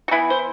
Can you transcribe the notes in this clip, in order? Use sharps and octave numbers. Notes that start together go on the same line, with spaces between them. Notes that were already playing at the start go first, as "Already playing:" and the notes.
F#4
E3 B3 E4
C5